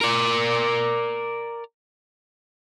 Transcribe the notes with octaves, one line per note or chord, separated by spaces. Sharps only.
A#4 D5